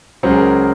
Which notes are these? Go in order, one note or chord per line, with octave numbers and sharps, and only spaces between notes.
C#2 C#3 F#3 C5
G#4
A#4